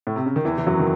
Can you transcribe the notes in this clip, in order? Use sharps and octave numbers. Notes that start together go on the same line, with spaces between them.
A2
C3
C#3
D#3
E2 E3
E3
F#2 F#3
D#3